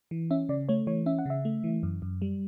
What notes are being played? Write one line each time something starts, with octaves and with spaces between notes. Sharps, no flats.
E3
C#4 E5
C#3 D5
A3 C#5
E3 C#5
C#4 E5
F#5
C#3 E5
A3
E3
F#2
F#2
G3